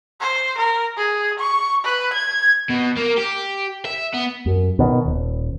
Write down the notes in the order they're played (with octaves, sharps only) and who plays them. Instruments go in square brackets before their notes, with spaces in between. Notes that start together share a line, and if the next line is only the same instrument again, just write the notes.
[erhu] C5
A#4
G#4
C#6
B4
G#6
[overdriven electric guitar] B2
A#3
G4
E5
B3
[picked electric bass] F#2
B2 D#3
D#1